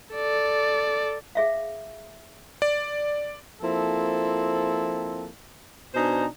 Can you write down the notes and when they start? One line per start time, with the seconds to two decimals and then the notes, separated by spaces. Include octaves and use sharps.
0.14 A4 D5
1.35 G#4 E5 F5
2.62 D5
3.62 F3 A#3 C4 E4 A4
5.94 B2 D4 D#4 C5 G#5 A#5